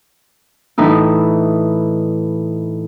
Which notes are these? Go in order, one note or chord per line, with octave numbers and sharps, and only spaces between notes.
A2 E3 D#4 E4